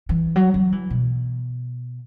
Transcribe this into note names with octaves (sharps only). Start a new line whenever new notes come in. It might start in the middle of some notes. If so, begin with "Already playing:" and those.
E3
F#3
F#3
E3
B2